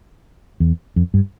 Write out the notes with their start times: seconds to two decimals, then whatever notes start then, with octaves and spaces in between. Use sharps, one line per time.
0.60 E2
0.96 F2
1.14 G2